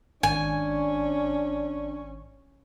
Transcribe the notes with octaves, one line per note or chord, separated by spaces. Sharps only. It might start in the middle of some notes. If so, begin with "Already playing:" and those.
G#1 C#4 D4 G#5